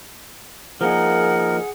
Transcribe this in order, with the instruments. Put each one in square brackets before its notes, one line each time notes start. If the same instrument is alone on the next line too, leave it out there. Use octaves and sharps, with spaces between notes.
[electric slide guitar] F3 A#3 D#4 [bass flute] G#4 [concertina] A#4 [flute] F#5